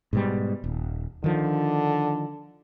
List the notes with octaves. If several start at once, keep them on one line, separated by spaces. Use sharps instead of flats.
G#2 B2 G3
D#1
D3 D#3 F3